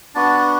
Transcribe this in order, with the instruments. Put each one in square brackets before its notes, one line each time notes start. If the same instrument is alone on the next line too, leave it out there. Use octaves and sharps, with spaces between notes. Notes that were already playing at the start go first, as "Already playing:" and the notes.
[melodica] B3 D4 F#4 A5